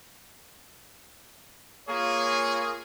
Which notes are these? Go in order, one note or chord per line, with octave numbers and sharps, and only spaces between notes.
A#3 F4 G#4 C#5